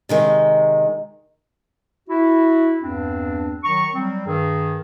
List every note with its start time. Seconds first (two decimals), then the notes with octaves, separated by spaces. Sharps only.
0.09 C3 D#3 G#3
2.09 E4 F#4
2.82 E2 G2 C4 D4
3.64 D#3 F#3 A#5 C#6
3.94 F#3 G3 C4
4.26 G2 D#3 G#4